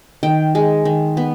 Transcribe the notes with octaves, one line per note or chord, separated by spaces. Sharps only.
D#3 G5
G#3
D#3
B3